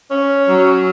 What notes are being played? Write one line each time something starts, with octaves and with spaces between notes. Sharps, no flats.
C#4
F#3